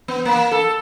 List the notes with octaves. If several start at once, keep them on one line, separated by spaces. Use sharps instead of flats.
B3
A#3
A4